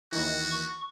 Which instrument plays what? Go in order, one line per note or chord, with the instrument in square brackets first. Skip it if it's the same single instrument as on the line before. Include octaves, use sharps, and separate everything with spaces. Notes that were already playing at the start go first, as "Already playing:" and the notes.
[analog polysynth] D#2 D#3 E3 [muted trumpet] F#4
[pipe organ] C#6